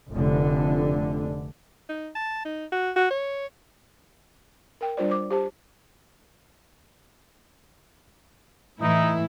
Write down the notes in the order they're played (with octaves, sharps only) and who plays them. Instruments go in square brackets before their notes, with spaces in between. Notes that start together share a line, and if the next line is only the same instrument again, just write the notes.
[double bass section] F1 D3
[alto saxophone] D#4
A5
D#4
F#4
F#4
C#5
[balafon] A#4 G5
G3 D4 F4 C5 D5
C5 D6
G4 C5 A5
[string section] A2 E3 E4 [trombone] D#4